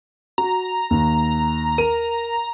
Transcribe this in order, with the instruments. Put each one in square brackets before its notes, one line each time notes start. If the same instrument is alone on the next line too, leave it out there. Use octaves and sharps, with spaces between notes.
[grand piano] F#4 [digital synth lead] A#5
[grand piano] D#2
A#4 D#7